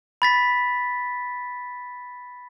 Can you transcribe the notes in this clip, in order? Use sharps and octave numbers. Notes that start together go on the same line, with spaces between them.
B5 A6 B6